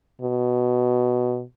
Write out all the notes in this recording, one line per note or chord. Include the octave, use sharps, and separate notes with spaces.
B2